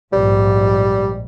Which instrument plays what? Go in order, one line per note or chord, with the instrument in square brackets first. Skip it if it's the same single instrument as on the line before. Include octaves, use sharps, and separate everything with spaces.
[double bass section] A#1 G#2 [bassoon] G3